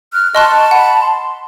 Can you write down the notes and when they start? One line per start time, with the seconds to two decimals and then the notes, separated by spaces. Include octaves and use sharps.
0.13 F6 F#6
0.35 D#5 A5 C6 C#6 F#6
0.71 F#5 B5
1.01 C6